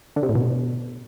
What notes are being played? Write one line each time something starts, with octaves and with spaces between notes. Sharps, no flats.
D3
C3
A2
B2